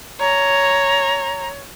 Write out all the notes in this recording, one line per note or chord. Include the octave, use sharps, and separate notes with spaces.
C#5 A#5